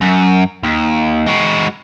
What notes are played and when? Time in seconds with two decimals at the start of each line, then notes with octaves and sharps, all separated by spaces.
0.01 F#2
0.63 D#2
1.27 G#3 F#4